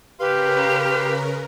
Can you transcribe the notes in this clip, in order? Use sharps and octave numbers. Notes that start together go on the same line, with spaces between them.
C#3 G4 A#4 B4 F5 C6